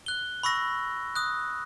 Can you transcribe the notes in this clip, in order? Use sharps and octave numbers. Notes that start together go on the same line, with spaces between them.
F#6 G7
B5 C#6 E6 A#6
D#6 F#6